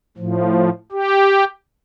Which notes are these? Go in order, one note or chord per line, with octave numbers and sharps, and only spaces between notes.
A2 F3
G4